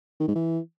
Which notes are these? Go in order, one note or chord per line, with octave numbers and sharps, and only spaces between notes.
D#3
G#2
E3